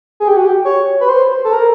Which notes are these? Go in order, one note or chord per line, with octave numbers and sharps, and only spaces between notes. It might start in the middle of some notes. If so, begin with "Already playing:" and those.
G#4
G4
F#4
G4
C#5
B4
C5
A4
A#4